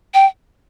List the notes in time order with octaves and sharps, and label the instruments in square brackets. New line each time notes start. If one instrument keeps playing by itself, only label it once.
[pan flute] G5